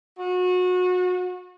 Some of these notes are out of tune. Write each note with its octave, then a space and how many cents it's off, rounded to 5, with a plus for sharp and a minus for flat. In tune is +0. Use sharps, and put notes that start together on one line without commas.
F#4 -30